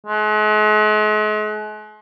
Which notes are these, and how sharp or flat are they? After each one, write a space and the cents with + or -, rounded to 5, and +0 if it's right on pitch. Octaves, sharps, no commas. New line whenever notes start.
G#3 +40